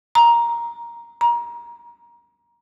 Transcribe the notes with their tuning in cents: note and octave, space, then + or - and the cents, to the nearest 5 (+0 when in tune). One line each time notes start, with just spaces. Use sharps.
A#5 +10
A#5 +20